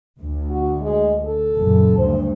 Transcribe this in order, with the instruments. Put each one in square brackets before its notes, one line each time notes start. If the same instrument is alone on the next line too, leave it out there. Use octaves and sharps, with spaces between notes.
[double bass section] D2
[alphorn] F#4
G#3
A4
[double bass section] F#1 F#2 A#2
[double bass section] D2 G2 [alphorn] C5